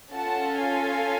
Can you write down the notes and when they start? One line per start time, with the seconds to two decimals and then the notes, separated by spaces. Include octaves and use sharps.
0.13 C#4 F4 A4 F#5 A5
0.60 F5 G#5